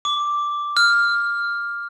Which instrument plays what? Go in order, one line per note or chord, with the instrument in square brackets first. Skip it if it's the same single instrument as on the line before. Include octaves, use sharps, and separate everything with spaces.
[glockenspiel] D6
F6